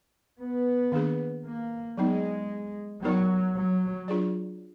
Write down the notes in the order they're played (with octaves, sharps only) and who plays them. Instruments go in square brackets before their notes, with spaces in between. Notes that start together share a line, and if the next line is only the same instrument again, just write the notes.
[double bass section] B3
[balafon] D#3 A#3 D4 G#4 B4
[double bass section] A#3
[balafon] F#3 B3 D#4 [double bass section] G#3
[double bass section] F#3 [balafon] B3 D#4 A#4 D5
[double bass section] F#3
[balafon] F#3 D4 F4 G#4 D5